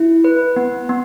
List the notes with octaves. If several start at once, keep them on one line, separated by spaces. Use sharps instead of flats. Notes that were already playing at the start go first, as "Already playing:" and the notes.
Already playing: E4
B4
B3
B3